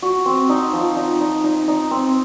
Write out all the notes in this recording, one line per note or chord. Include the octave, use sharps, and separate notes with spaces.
F#4
C4
D#4
F3
D#4
D#4
D#4
D#4
C4